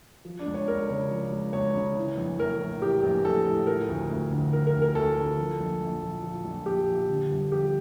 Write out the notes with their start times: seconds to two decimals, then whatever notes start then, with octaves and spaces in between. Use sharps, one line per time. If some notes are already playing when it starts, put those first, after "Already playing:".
0.25 F3
0.39 D4
0.46 C#2
0.54 C#5
0.68 C#2 A#4
0.89 C#3 C#5
1.11 F3
1.32 C#2
1.53 C#2 C#5
1.75 C#3
1.96 E3
2.17 A#1
2.38 A#1 A#4
2.60 A2
2.82 E3 G4
3.03 A#1
3.24 A#1 A4
3.46 A2
3.67 F3 A#4
3.88 D2
4.10 D2
4.31 D3
4.53 F3 A#4
4.67 A#4
4.74 D2
4.82 A#4
4.95 D2 A4
5.17 D3
5.38 F3
5.60 A#1
5.81 A#1
6.02 A#2
6.23 F3
6.45 A#1
6.66 A#1 G4
6.87 A#2
7.09 D3
7.31 G1
7.52 F3 G4